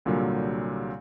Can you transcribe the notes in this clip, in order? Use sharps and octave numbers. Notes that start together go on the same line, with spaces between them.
C2 A#2 D3 F#3 G3